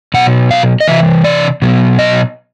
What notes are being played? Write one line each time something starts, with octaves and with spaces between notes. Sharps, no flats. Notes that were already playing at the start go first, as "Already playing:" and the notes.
B2 F#3 F#5
F5
D#5
C3 E3 E5
D5
B2 F#3
D#5